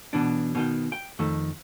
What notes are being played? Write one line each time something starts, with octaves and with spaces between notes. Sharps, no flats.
B1 B2 E3 D4
B2 D#3 G5
G5
F2 D#3 A3